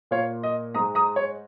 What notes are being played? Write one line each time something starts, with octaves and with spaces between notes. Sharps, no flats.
A#2 A#3 C#5 F5
D#5
G#2 G#3 A#5 D#6
A#5 D#6
C#5